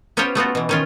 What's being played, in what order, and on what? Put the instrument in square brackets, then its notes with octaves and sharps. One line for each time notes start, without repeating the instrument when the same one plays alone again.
[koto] B3 C#4 F4 G4 C5 C#5
A3 B3 F4 F#4
B2 E3
D#3 C#4 F4